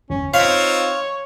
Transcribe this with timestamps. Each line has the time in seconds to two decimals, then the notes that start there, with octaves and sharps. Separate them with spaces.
0.10 G1 E2 C#4
0.34 C4 D#4 F4 C#5 F5 B6